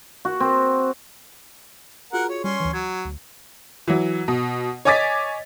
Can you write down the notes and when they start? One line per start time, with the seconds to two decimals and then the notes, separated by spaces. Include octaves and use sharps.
0.25 F#4
0.40 C4
2.13 F4 F#4 G#4 A#4 F#5
2.29 C#5
2.44 G3 C#4 C6
2.60 D2 E3
2.73 F#3 G#6
3.05 D2
3.88 E3 F#3
4.28 B2
4.85 C#5 D#5 G#5 D6 A6 B6